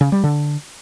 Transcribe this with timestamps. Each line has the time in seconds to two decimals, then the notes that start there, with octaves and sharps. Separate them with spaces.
0.01 C#3
0.12 G3
0.24 D3